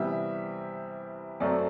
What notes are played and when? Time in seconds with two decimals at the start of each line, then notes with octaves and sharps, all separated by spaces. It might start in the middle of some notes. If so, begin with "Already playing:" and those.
Already playing: C3 E3 G3 B3 E5
1.40 F#2 F#3 A3 C4 D5